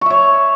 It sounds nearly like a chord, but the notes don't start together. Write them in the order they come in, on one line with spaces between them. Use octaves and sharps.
C#6 E5 C#5